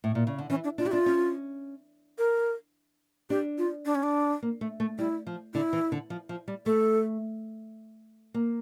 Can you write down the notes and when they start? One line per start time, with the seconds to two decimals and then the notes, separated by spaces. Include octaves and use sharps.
0.04 A2
0.15 A#2
0.27 C#3
0.39 D3
0.50 E3 C#4
0.64 D4
0.78 D4 F4
0.85 E4 G4
0.92 D4 F4
1.06 C#4
2.18 A#4
3.30 D4 G4
3.58 F4
3.86 D4
3.95 C#4
4.03 D4
4.43 A#3
4.61 A3
4.80 A3
4.99 G3 E4
5.27 F3
5.54 D3 E4
5.73 E3
5.92 D3
6.10 F3
6.29 F3
6.48 G3
6.66 A3 A4
8.34 A#3